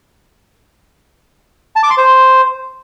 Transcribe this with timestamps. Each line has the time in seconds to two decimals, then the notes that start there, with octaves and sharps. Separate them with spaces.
1.76 A5
1.83 D6
1.90 C6
1.97 C5